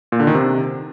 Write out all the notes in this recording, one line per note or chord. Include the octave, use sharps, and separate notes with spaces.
A#2
D3
D#3
C3